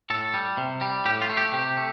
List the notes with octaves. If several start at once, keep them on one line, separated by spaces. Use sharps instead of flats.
A2 A4
G3
C3
G3
A2 G4
F4
A3
G4
C3 G4
A3